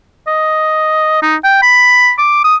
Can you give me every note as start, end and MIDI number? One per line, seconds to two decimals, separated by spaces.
0.27 1.19 75
1.22 1.36 63
1.44 1.61 79
1.62 2.12 83
2.18 2.41 86
2.44 2.56 87